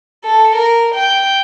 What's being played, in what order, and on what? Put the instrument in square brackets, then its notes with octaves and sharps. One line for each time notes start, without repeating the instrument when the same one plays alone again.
[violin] A4
A#4
G5